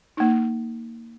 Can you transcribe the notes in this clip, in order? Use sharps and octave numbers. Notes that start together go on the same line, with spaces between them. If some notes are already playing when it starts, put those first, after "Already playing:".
A#3 D#4